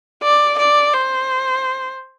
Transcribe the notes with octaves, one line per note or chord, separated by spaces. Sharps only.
D5
D5
C5